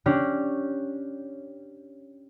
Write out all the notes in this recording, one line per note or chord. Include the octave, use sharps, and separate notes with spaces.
C#4 D4 G4